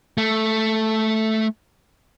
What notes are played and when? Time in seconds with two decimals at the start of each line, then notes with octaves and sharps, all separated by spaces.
0.18 A3